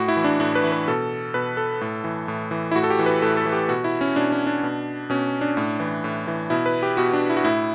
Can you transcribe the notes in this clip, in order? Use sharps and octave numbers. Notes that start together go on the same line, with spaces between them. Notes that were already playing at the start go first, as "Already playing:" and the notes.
Already playing: A2 F#4
E4
E3
D4
A2 D4
B4
E3
B4
B2 A4
B2 B4
A4
A2
E3
A2
E3
E4
A2 F#4
A4
G4
E3
B4
A2 A4
A4
E3
G4
B2 F#4
E4
C#4
B2 D4
C#4
D4
B2
B2 C#4
D4
A2
E3
A2
E3
B2 E4
B4
G4
B2 F#4
D4
E4
F#4
A2 E4